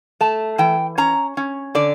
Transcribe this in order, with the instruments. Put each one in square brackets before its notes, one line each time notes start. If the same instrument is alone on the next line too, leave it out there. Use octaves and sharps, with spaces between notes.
[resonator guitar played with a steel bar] A3 A5
E3 G5
C#4 A#5
C#4
D3 D5